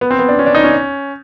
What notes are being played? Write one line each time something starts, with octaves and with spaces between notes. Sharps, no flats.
B3
C4
B3
D4
C#4
D4
D#4
C#4